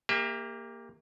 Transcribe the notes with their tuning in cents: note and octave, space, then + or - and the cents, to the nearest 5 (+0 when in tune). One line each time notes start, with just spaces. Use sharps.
A#3 +0 G4 +35 E5 +0